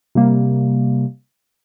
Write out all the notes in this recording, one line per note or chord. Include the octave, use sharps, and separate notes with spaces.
C3 G3 A#3